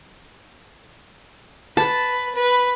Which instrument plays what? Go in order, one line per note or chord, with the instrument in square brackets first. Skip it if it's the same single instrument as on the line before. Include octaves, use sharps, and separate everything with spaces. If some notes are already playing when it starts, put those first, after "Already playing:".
[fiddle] B4 [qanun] A5
[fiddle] B4